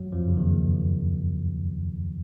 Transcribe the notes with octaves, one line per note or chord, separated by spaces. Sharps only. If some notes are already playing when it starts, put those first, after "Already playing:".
Already playing: F#2 F#3
F2 F3
C#3
D#2 D#3